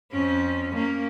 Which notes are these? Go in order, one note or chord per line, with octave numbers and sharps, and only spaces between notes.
F2 C#4
A#3 C#4